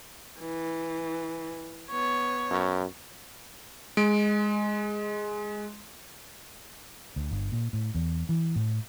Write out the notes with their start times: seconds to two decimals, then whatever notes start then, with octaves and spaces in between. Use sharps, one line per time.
0.40 E3
1.90 B3 C#5
2.50 F#2
3.97 G#3 D7
7.16 D2
7.31 G1
7.52 A#2
7.73 A2
7.95 E2
8.29 E3
8.56 A2